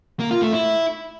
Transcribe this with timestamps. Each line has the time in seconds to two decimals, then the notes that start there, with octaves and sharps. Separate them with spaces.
0.19 A#3
0.31 F4
0.42 A3
0.53 E4